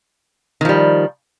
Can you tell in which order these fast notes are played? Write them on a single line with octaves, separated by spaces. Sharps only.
D#3 F3 G3